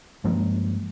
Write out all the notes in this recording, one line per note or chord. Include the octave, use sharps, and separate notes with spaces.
G2 F3 G#3 A#3